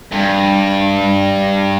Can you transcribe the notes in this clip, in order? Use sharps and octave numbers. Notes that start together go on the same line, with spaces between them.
G2